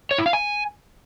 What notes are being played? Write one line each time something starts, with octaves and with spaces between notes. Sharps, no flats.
C#5
E4
F5
G#5